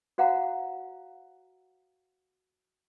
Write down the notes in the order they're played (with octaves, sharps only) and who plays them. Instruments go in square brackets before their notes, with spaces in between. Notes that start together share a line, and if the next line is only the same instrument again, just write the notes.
[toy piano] F#4 C5 F5 F#5 A#5